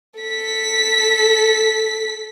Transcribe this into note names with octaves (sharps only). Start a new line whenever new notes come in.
A4 B6